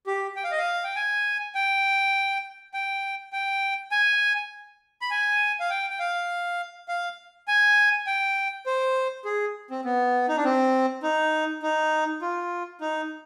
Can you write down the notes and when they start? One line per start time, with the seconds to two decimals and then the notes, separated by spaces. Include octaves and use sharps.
0.07 G4
0.36 G5
0.44 F5
0.51 D#5
0.58 F5
0.84 G5
0.96 G#5
1.55 G5
2.74 G5
3.33 G5
3.91 G#5
5.01 B5
5.11 G#5
5.60 F5
5.70 G5
5.90 G5
5.99 F5
6.88 F5
7.48 G#5
8.07 G5
8.66 C5
9.25 G#4
9.70 C4
9.85 B3
10.29 D#4
10.37 D4
10.44 C4
11.03 D#4
11.63 D#4
12.22 F4
12.81 D#4